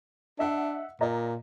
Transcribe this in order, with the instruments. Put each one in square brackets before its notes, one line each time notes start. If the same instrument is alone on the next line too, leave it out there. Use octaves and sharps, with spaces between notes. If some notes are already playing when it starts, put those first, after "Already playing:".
[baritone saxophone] D4 [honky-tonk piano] D#5 E5 F#5
[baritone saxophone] A#2 [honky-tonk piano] D5 D#5 A#5